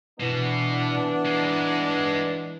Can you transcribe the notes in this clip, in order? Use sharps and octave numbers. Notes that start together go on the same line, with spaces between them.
B2 E3 B3 D4
G#3 D#4